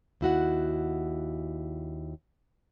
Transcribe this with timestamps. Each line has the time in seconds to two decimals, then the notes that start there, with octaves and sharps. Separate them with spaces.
0.21 D#2 E4 F#4 F#5